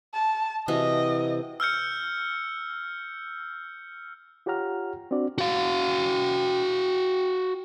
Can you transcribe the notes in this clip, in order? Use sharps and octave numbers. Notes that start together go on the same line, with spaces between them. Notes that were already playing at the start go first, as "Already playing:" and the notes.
A5
C3 E3 F#4 D#5
E6 F6 G6 C#7
F4 G4 C#5 F#5 A#5 F6
C4 D4 F#4 D5
F#4 F5